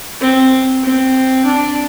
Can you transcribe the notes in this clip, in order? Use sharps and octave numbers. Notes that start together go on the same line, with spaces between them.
C4
C4
D4